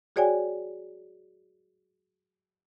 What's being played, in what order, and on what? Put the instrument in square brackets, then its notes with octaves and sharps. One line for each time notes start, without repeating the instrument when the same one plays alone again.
[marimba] F#4 G#4 C#5 D5 G5 G#5